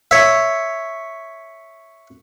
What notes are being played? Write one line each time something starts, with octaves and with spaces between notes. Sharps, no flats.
C#5 E5